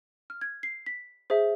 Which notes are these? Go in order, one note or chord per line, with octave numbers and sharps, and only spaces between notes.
F6
G#6
C7
B6
G#4 C5 E5